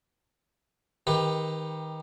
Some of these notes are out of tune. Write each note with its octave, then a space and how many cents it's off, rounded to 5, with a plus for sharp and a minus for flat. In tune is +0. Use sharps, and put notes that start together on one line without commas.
D#3 +15 G4 +25 B4 +0